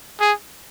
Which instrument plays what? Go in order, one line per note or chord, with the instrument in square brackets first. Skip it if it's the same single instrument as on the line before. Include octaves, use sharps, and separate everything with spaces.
[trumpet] G#4